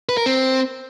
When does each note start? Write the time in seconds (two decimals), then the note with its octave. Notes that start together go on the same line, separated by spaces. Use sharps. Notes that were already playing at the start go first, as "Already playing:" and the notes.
0.09 B4
0.18 A#4
0.26 C4